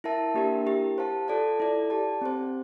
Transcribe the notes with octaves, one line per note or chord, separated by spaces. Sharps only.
E4 A#4 E5 A5
A#3 D4 G4 A#4 E5
E4 G4 A#4
G4 C5 F5 A5
F4 A4 D5 A5
E4 A4 D5
G4 D5 A5
C4 G4 C5